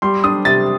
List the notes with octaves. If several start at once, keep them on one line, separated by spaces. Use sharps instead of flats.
G3 C6
D4 D#6
C3 A6